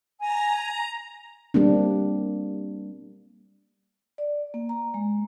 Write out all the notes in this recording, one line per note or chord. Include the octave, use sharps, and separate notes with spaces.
G#5 A#5
G3 A#3 C4 D4
D5
A#3
A#5
G#3